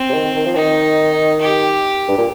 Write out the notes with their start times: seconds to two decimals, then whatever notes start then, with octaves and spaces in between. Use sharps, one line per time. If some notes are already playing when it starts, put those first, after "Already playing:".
Already playing: C4
0.09 C3
0.14 D#3
0.36 D#3
0.46 F3
0.55 D#3 D#4
1.41 G4
2.08 G2
2.17 A#2